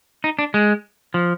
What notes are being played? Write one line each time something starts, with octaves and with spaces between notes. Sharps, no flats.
D#4
D4
G#3
F3